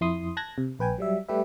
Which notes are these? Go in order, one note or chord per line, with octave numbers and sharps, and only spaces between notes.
F2 E4 C6 D#6
A5 F#6 G#6 A#6
C3
A#1 B4 G5 G#5
F#3 G3 E5
G3 A3 G4 B4 E5